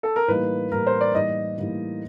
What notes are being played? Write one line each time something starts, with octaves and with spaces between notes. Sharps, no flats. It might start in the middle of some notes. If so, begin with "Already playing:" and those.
A4
A#4
A2 E3 G3 A#3 D#4 B4
A2 E3 G3 A#3 D#4 A#4
C5
D5
A2 E3 G3 A#3 D#4 D#5
A2 E3 G3 A#3 D#4